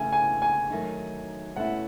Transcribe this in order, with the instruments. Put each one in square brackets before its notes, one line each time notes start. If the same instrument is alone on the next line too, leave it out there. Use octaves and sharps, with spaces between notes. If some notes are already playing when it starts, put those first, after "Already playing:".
Already playing: [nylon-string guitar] C#3 E3 A3 [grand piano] G#5
[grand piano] G#5
G#5
[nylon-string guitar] D#3 F#3 A3 D#4
[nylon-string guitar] B2 A3 C#4 E4 [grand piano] F#5